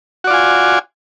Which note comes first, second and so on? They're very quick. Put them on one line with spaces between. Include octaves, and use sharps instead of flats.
F#4 D5 F4 G#5